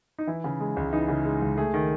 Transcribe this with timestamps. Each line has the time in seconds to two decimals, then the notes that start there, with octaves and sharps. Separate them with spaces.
0.18 D#4
0.27 E3 E4
0.44 C#3
0.60 G#3
0.76 C#2
0.93 E3 D#4
1.08 C#3
1.25 G#3
1.42 C#2
1.57 A3 G#4
1.74 D#3